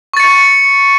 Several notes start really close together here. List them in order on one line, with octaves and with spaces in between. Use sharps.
C#6 A6 C#7